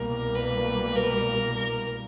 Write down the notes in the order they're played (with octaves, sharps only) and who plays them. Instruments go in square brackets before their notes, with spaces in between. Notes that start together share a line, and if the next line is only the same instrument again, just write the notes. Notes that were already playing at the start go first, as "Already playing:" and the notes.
Already playing: [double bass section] C2 B2 G3 A#3 [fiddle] A#4
[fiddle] B4
A#4
A#4